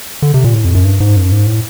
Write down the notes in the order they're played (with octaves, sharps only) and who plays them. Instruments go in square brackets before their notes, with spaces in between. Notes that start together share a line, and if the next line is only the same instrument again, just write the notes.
[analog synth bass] D3
C3
A#2
A2
F2
F#2
G2
G#2
F#2
G#2
A2